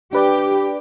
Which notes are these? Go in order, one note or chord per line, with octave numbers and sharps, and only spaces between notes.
D4 G4 B4 D5